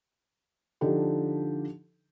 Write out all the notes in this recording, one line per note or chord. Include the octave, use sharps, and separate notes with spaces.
D3 F3 D4 D#4 G4 A4